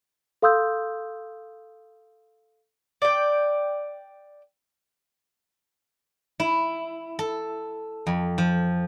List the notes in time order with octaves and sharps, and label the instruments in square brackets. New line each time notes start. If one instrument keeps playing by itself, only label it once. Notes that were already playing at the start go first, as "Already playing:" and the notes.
[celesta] A4 F5 C6 D#6 E6 G6
[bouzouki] D5 G5
[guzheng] E4
A4
F2
F3